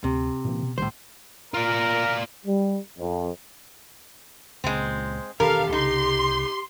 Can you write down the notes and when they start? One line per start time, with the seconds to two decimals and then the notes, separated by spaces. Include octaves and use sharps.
0.04 D2 C3
0.45 A#2 E3 A#3
0.63 B2
0.78 C2 A2 D#3 G3 C5
1.54 F4 A#4 D5
2.46 G3
2.98 F2
4.64 C#2 A#2 G#3 C4
5.40 E1 D#3 D4 G4 A4 A#4 F5
5.73 C2 C#3 D#4 C6